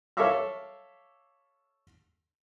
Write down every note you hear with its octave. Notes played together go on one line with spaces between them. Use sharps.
A4 C#5 E5 F5 D6 E6